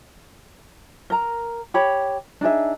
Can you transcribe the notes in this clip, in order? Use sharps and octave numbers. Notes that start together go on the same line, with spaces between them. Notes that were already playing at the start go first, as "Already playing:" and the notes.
A#4 A#5
G4 C#5 B5
D4 D#4 G#4 E5